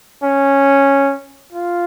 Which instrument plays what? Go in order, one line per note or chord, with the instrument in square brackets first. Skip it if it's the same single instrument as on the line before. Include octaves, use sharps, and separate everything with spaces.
[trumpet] C#4
F4